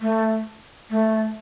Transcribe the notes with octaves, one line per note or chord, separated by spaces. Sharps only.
A3
A3